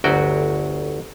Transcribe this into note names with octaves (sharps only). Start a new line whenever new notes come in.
G1 D2 F#3 F#4 G5